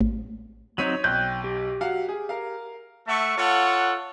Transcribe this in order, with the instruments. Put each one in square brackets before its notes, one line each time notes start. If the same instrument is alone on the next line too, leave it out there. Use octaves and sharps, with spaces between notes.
[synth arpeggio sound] A1
[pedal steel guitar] F#3 C4 D#4 [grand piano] C#5 B6 D#7
[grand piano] B1 [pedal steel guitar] G5 F#6 G6
[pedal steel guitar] G4
[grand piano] F#3 F5 F#5
G#4
A#4 F5
[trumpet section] A3 A4 E5 F#5 C#6
F4 A4 C#5 F#5